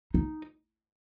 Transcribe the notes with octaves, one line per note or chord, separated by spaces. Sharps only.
D#4